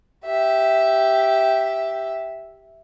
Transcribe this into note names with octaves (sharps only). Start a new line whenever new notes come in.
G4 E5